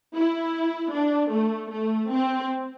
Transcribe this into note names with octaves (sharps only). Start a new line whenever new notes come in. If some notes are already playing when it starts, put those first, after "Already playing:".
E4
D4
A3
A3
C4